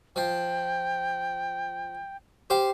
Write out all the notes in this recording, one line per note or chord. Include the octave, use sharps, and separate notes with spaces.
F3 F4 G5
G4 C5 F5